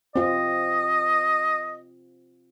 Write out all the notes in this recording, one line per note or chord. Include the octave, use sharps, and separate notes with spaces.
C4 F4 D#5